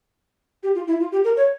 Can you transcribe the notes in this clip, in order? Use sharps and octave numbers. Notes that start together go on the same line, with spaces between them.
G4
F4
E4
F4
G4
A#4
C#5